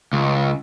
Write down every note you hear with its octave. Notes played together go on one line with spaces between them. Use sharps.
C#2